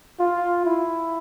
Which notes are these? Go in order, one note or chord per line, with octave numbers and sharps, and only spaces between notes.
F4
E4